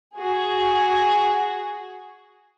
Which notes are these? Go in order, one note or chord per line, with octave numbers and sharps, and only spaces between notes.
F#4 G#4